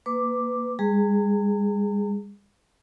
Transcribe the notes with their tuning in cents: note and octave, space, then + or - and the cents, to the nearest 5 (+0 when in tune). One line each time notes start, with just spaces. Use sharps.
A#3 +0 B4 +20 D6 +0
G3 +45 G#4 +0 A#5 -45